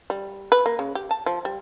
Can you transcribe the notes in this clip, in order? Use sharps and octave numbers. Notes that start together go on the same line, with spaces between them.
G3
B4
A#3
C#3
G4
A5
F3
G3